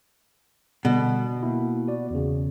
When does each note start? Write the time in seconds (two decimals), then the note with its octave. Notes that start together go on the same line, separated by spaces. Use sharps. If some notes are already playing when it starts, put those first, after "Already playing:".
0.85 B2 D3 G3
1.43 A#3 E4
1.88 F#4 D5
2.11 E2 C#3